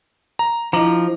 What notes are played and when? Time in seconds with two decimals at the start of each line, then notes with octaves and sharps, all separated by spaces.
0.39 A#5
0.73 F3 D4 E4 D#5 A#5